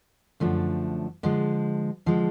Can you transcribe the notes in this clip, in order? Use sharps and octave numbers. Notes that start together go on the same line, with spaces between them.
F#2 D3 F3 A3 D4
D3 F3 G#3
D3 F3 G#3